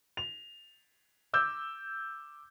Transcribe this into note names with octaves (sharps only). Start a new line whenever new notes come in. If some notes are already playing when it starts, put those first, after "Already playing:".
F7
D6 E6 G6